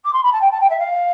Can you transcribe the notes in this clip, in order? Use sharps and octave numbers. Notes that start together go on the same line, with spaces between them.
D6
C6
B5
A5
G5
A5
G5
E5
F5